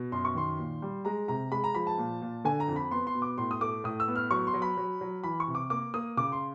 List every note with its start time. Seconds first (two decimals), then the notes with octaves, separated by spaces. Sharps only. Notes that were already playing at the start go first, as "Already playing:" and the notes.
Already playing: B2
0.12 F#2 C6
0.25 C#6
0.35 D#3 C6
0.59 A#2
0.82 G3
1.05 G#3 A#5
1.28 C3 A#5
1.52 G#3 B5
1.64 A#5
1.75 F3 B5
1.87 A5
1.98 A#2
2.22 A#2
2.45 D3 G#5
2.60 A#5
2.68 F2
2.76 B5
2.91 B3 C6
3.07 C6
3.15 B2
3.22 D6
3.38 A2 C6
3.51 D#6
3.61 A3 D6
3.84 A2 D#6
4.00 E6
4.08 B3
4.16 F6
4.31 F#3 C#6
4.47 C6
4.54 F#3
4.62 B5
4.77 F#3
5.01 F#3
5.24 E3 B5
5.40 C#6
5.48 C3
5.55 D6
5.70 A#3 D6
5.94 A#3 D#6
6.17 C#3 D6
6.32 C6